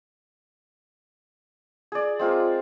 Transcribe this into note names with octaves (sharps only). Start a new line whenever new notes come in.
G#4 D5
G#3 C4 F4 A#4